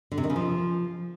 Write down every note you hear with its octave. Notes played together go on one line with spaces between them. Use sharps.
D3
C3
D#3
C#3
F3